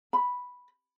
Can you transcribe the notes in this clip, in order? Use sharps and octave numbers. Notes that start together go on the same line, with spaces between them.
B5